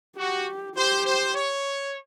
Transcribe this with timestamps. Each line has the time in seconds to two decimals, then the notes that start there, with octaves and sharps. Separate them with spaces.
0.17 F#4 G4
0.75 G4 C5
1.05 C5
1.34 C#5